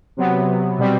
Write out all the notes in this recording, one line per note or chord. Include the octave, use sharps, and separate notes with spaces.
C3 F#3 B3
B2 G3 C4